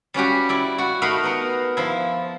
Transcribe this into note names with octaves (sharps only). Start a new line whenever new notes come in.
G3 C#4 F#4 G4
E4 D5
F#4
A3 D#4 F#4 A#4 B5 C6
B3 A#4 F#5
F3 E4